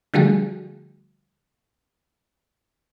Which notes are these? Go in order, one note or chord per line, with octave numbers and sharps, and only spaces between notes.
D3 F3 G3 A3 F#4 G#4